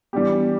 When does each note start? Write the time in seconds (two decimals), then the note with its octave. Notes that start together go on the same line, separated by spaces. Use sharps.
0.13 E3 G3 B3 D4 G4